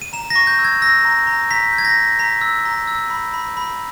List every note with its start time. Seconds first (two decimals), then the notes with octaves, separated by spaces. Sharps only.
0.02 D#7
0.13 A#5 E7
0.30 A#6
0.36 C#6
0.47 G6
0.59 E6
0.65 G#6
0.82 E6 A#6
1.05 A#5
1.27 A#5
1.50 A#5 B6
1.73 G6
1.78 G#6
1.85 A#6
1.97 G6
2.19 A#5 B6
2.41 E6
2.65 A#5
2.87 E6
3.10 B5
3.34 B5
3.57 B5